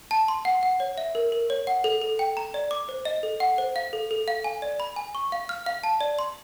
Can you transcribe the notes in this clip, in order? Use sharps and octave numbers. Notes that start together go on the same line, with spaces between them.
A5
C6
F#5
F#5
C#5
E5
A#4
A#4
C#5
F#5
A4
A4
G5
A#5
D5
D6
C5
D#5
A4
F#5
C5
F5
A4
A4
F5
G#5
D5
B5
G#5
C#6
F5
F6
F5
A5
D5
C6